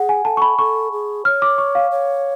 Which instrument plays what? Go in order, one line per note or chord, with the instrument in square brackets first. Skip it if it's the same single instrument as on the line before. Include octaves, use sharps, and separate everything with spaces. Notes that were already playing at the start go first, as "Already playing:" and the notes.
Already playing: [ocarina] G#4 [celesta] F#5
[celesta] G#5
[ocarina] A4 [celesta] A5
[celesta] C#6
B5
[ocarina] A4 [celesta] C#6
[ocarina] G#4
[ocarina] C#5 [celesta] F6
[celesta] D6
C#6
F5
[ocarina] C#5